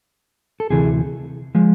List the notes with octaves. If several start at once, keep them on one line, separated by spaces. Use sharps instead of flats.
A4
D2 C3 E3 G#4
F3 G#3